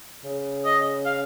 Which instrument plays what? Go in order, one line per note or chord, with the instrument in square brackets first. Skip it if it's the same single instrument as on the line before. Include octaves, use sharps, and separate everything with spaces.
[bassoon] C#3
[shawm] D#5
F5